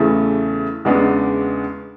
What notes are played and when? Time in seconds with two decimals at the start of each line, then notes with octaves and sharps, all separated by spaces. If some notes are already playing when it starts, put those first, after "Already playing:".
Already playing: E2 C#3 E3 A3
0.85 E2 C#3 G#3 B3 D4